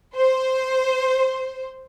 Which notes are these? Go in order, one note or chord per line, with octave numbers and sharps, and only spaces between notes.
C5